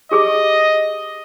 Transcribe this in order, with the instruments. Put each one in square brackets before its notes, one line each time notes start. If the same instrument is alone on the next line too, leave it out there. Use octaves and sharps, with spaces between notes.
[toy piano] G4 G#4 D6 [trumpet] D#5